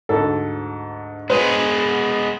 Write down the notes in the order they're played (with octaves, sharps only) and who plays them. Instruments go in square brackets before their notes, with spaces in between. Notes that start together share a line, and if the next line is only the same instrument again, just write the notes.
[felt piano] D2 G#2 [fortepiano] A4
[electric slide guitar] G#3 B3 [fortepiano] B4 C5